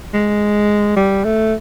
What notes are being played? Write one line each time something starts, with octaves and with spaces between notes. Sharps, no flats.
G#3
G3
A3